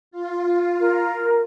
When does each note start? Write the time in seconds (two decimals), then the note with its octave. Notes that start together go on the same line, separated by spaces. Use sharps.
0.11 F4
0.79 A#4